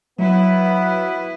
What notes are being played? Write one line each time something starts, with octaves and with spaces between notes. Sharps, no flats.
F#3 B3 E4 B4